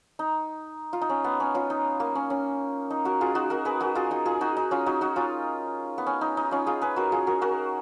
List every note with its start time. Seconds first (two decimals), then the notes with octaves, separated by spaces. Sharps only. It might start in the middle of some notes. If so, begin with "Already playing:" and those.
0.19 D#4
0.93 F4
1.02 D#4
1.10 C#4
1.24 B3
1.40 C#4
1.55 C#4 F4
1.70 D#4
2.00 A#3
2.15 C#4
2.30 C#4
2.90 D#4
3.05 F#4 A#4
3.21 F4 G#4
3.35 D#4 F#4
3.50 F#4 A#4
3.65 G#4 B4
3.80 F#4 A#4
3.95 F4 G#4
4.11 D#4 F#4
4.26 F4 G#4
4.41 D#4 F#4
4.57 D#4
4.71 C#4 F4
4.86 D#4 F#4
5.01 D#4 F#4
5.16 C#4 F4
5.98 B3
6.06 C#4
6.21 D#4
6.37 D#4
6.51 C#4 F4
6.67 F4 G#4
6.81 G#4 B4
6.96 F#4 A#4
7.12 F4 G#4
7.27 F#4 A#4
7.42 F#4 A#4